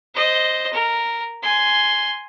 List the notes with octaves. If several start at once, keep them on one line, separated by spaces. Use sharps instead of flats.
C5 D#5
A#4
G#5 C6